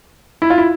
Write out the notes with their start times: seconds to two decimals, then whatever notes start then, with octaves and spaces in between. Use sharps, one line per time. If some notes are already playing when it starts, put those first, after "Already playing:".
0.42 E4
0.50 F4
0.58 E4